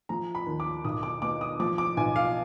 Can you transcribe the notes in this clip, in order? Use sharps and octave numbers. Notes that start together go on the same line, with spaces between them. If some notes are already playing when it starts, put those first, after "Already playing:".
F3 A#5
B5
D#2
D6
B1 D#6
D6
B2 D6
D#6
F3 D6
D6
B1 G#5
F5